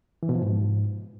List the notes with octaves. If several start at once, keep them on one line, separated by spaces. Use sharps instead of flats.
E3
B2
F3
G#2